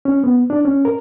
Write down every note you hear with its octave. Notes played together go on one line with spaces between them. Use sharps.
C#4
B3
D4
C#4
A#4